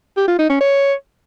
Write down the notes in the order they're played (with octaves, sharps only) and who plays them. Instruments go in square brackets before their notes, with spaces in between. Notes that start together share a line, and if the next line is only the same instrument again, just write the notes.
[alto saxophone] G4
F4
D#4
C#4
C#5